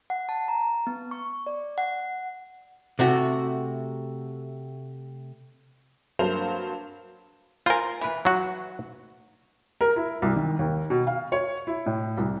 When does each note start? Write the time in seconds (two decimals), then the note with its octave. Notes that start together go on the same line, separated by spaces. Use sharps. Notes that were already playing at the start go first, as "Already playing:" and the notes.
0.10 F#5
0.29 A5
0.48 A#5
0.87 B3
1.11 C#6
1.46 D5
1.78 F#5
2.99 C3 A3 F#4
6.19 G2 F#3 A#3 C5 F5 F7
7.66 F4 A#4 C5 G#5
8.01 E3 B4
8.25 F#3 F#4
9.81 A#4
9.96 E4
10.22 C2
10.36 D#3
10.59 D#2
10.90 B2
11.07 F5
11.32 C#5
11.67 E4
11.86 A2
12.17 C2